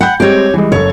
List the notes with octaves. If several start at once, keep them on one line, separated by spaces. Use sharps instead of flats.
F#5 G5 B5 G6
G3 G#3 C4 G4 C#5
E3 G3 G#3
F#1 A4 C#5